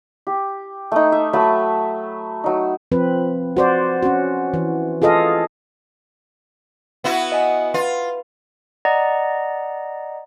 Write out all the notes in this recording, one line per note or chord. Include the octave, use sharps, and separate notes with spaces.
G4
A3 D#4
E5
F#3 A3 A5 B5
F#3 D#4
F3 C4 B4
F#4 C5 D5
C#4 F#4
E3
F4 G#4 A4 D#5 F5
B3 E4 F#4
D#5 G#5
F4 B4
D5 D#5 F#5 A#5